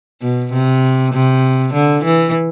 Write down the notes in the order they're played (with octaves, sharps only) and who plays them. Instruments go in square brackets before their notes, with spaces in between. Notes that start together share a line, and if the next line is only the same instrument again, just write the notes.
[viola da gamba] B2
C3
C3
D3
E3